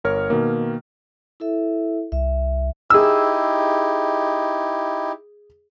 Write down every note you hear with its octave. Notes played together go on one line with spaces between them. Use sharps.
G1 A#4 C#5 F6
B2 D#3 A#3
E4 A4 E5
C2 E5
D#4 E4 G4 G#4 E6